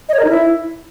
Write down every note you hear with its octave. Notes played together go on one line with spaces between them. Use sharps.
D#5
C#5
A#4
D#4
E4